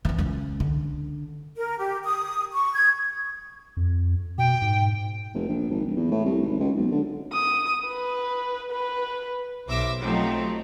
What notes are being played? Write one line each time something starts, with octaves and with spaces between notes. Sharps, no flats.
E3 C4
C#2 C#4
D3
A#4
G4
D#6
C#6
G#6
F2
B2 G5
G#2
F1
A#1
G#1
D1
E2
A2
C2
G#1
C#2
B1
D3
D#6
B4
B4
B1 C5 E5 D6 E6 A#6
F3 F#3 A3 C4 D#4 G4